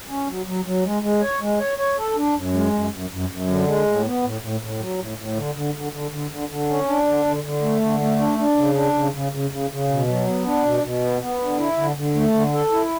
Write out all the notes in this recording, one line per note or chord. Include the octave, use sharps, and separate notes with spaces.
C#4
F#3
F#3
F#3
G#3
G#3
C#5
G#3
C#5
C#5
A4
D4
F#2
G#3
F#2
F#2
F#2
F#2
D3
G#3
A2
B3
A2
A2
A2
F#3
A2
A2
D3
D3
D3
D3
D3
D3
D3
C#4
D4
D3
D3
D3
A3
D3
A3
D4
D4
C#3
D4
C#3
C#3
C#3
C#3
C#3
B2
F#3
B3
D4
B2
B2
B3
B3
D3
E4
D3
D3
A3
D3
A4
E4